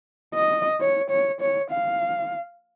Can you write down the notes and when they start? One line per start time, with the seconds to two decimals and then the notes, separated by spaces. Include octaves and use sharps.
0.34 D#5
0.80 C#5
1.10 C#5
1.41 C#5
1.71 F5